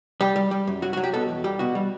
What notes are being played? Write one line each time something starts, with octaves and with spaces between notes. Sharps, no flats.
G3 G4
G3
G3
F#2
F#3 F#4
F#4
F#3
G4
B2 A4
E2
G3 G4
B2 F#4
G3